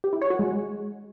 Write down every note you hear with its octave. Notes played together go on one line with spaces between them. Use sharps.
G4
E4
C#5
F#4
G#3